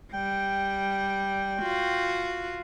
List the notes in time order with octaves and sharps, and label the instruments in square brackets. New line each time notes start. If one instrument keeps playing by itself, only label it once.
[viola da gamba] G3 [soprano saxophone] G5
[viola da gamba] F4 F#4